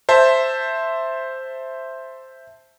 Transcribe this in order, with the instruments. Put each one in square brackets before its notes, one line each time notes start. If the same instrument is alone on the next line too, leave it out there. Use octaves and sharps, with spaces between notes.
[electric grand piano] C5 E5 A5